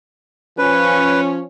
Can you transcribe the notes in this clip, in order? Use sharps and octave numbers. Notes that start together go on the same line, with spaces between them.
F3 C#4 B4